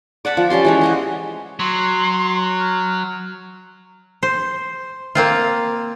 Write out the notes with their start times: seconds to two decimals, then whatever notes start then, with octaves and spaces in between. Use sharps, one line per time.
0.25 D5 F#5 A5 B5
0.37 F3
0.50 G3 C#4 G4 C6
0.65 E3 G#3 C#5
0.81 G4 D#5 F#5
1.60 F#3 C6
2.60 F6
4.23 C5
5.15 A#3 C4 F4